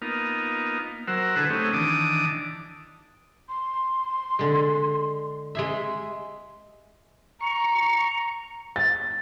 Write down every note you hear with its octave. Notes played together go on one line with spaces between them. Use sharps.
A#3 B3 D#4 F4
F#3 A#4 C5 F#5 E6
D3 E4 G#4 A4 B4
A3 C4 C#4 D#4 G4
D#3 E3 D4 A5 D6 D#6
C6
D3 G#3
G#3 G#4 E5
A#5 C#6
A6